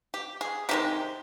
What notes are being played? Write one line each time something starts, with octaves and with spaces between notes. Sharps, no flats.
G4
G#4
C3 D#3 G#3 G4